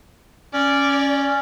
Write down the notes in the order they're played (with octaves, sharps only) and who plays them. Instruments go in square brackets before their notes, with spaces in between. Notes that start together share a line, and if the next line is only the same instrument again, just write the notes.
[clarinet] C#4 [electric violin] D5